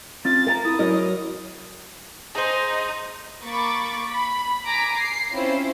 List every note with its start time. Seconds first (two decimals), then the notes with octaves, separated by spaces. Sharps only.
0.25 C4 F4 A6
0.46 A#4 F5 G#5 A#5
0.65 E4 D#6
0.79 F#3 E4 A#4 D#5
2.35 D#4 G#4 C5
3.42 A#3 B5 C#6 D6 A6
4.05 B5
4.65 G#5 A#5 D6 A#6 B6 D7
4.94 C7
5.30 C4 C#4 E4 F4 C5